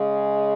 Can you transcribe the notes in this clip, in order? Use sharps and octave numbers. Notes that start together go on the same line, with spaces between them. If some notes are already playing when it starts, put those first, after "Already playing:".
Already playing: C#3 G#3